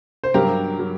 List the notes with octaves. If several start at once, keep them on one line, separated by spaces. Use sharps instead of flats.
C5
G2 F#3 G4 A#4
F#3